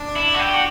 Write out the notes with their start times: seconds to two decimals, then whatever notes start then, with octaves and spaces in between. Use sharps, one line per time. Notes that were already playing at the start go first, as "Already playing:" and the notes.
Already playing: D4
0.16 E4
0.34 F#4
0.39 G4
0.54 F#4